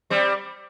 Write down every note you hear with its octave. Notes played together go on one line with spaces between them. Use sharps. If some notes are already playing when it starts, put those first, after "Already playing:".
G3 C4